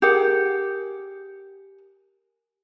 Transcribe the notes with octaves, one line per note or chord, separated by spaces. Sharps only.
G4 G#4 A#4 F#5